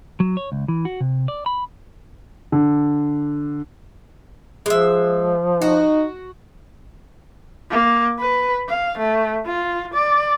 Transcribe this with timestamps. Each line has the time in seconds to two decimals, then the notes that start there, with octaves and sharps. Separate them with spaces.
0.20 F#3
0.37 C#5
0.52 C#2
0.68 E3
0.85 F#4
1.01 C3
1.28 D5
1.46 B5
2.52 D3
4.66 F3 G#3 E5
5.62 D#4 F#4
7.70 A#3
8.19 B4
8.69 F5
8.98 A3
9.46 F4
9.94 D5